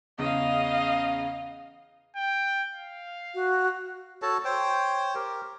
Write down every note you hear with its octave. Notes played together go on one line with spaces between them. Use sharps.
E2 C#3 D#5 F5
G5
F5
F#4
F#4 A4 C#5 A5
C5 C#5 G5
G4 A#4